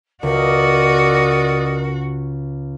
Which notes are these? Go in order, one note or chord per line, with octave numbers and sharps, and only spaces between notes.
C#2 F#4 A#4 D5 D#5